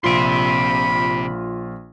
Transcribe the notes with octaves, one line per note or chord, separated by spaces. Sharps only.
A#1 C3 F4 B5 C6